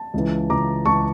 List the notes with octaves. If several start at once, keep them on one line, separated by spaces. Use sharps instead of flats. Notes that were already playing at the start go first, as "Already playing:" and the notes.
Already playing: A5
C#2 C#3 E3
C#2 C#3 E3 A#5 D6
C#2 C#3 E3 A5 C#6